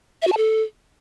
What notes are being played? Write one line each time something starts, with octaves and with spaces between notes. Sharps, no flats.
E5
F#4
A5
A4